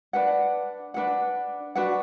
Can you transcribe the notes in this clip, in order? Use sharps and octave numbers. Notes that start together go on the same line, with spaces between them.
D4 B4 F#5
D4 B4 F#5
D4 F#4 B4 F#5